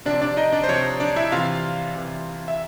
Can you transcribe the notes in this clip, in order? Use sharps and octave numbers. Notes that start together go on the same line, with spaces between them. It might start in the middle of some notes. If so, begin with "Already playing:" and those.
C3 F3 D4 D5
D4 D5
D#4 D#5
D4 D5
C5
C3 F3 C#5
D4 D5
E4 E5
C3 E3 F4 F5
C3 E3
E5